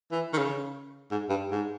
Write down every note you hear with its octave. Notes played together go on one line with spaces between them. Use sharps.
E3
D#3
C#3
G#2
G2
G#2